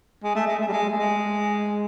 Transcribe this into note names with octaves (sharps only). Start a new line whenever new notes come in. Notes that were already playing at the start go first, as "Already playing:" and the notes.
G#3
A3
G#3
A3
G3
G#3
A3
G#3